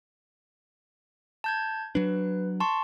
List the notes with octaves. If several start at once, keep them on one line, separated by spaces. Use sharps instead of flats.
A5 G6 G#6
F#3 D4 B4
A5 C6 C#6